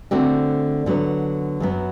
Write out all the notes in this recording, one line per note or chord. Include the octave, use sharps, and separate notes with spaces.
D3 A3 C4 F#4
D3 F#3 B3
F#2 F#3 B3